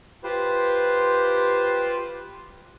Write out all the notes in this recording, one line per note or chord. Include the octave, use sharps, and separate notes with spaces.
F4 G4 B4 C5